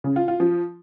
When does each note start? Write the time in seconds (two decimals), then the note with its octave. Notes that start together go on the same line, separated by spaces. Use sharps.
0.04 C#3
0.16 F4
0.28 F4
0.40 F3